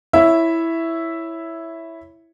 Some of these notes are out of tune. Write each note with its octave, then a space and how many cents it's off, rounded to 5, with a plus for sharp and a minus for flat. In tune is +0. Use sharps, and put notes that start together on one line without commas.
E4 +0 C#5 +0 E5 +0